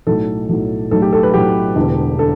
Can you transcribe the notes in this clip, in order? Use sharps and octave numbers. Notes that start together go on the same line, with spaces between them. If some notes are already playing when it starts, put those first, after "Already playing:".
B1 A2 F#3 A3 A4
B1 A2 F#3 A3
B1 A2 F#3 A3 A4
G4
A4
B4
B1 A2 F#3 A3 G4
E1 E2 D3
D3 A4